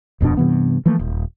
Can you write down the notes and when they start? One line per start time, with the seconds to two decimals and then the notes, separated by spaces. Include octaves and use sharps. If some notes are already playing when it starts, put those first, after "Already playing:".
0.20 D#1 F2 B2 D4
0.37 G2 C3 E3 B3
0.86 E3 F3 A3 A#3
0.99 D#1